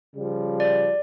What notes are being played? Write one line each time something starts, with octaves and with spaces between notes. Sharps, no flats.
C#3 F3 G3
D5